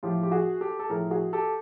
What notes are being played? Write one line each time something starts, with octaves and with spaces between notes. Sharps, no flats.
A2 F3 F4 G4
G4
F#4 G#4
G4 A4
A4
A2 F3 G#4 A#4
F#4 G#4
G4 A4